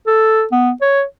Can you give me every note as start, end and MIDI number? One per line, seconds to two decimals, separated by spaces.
0.07 0.44 69
0.52 0.71 59
0.81 1.03 73